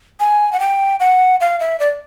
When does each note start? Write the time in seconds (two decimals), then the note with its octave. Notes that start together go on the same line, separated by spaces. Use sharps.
0.20 G#5
0.53 F#5
0.60 G5
1.00 F#5
1.41 F5
1.60 E5
1.80 D5